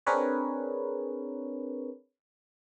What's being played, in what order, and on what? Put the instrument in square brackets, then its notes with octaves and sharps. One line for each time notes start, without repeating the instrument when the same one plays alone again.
[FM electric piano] C4 D4 G#4 A#4 B4 C#5